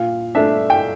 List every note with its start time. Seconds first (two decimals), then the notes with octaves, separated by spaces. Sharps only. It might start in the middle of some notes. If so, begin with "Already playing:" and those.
Already playing: A#2 F5
0.35 A3 D4 E5
0.70 G5